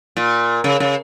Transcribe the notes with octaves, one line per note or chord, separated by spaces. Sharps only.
A#2
C#3
C#3